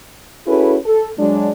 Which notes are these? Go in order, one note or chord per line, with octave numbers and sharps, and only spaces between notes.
C#4 E4 F#4 G#4 A4 B4
A4
F#3 G#3 D4